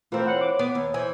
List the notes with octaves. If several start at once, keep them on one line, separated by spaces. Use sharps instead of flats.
E3 A3 C4 F4 A#4 C5
C#5 F#5
D6
B3 D6
D#2 C#5
E3 C5 G#5